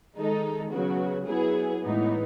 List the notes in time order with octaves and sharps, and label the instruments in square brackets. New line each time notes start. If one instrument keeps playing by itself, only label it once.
[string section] D#3 G#3 D#4 A4
C#3 F#3 B3 F#4
F#3 B3 E4 G#4
A2 E3 G#3 B3 D#4